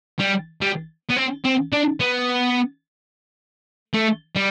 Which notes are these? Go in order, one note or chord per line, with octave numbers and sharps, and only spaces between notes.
G3
G3
B3
C4
C4
D4
B3
A3
G3